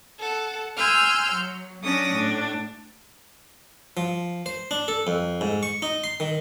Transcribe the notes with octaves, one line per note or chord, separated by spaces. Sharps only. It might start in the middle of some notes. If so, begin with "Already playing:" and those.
A4 F#5
G#5 C6 E6 F6 G6
F#3
F#3 C#4 D4 D#6 A#6
A2 D4
F3
C5
D4
A4
F2
G#2
C#6
D#4
C6
D#3